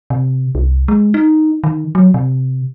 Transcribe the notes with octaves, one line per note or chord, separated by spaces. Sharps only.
C3
C2
G#3
D#4
D#3
F#3
C3